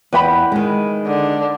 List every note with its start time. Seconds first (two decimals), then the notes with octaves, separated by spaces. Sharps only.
0.13 E2 B4 G5 B5
0.52 D#3 G#3
1.07 D3